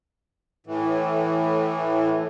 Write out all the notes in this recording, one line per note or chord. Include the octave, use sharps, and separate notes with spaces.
A2 E3